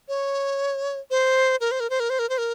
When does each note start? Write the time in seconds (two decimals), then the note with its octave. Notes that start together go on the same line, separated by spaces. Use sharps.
0.08 C#5
1.10 C5
1.61 A#4
1.71 C5
1.80 A#4
1.90 C5
2.00 A#4
2.10 C5
2.19 A#4
2.29 C5
2.38 A#4